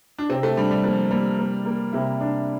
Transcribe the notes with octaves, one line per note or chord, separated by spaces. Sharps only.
D4
C3 C4
A3
G3 D4
G3
F3 A#3
G3 A#3
A#3
A#3
C3 E4
D4